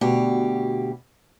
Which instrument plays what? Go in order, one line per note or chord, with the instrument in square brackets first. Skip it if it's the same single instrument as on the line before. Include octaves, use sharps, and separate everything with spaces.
[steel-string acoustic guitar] D2 B2 G4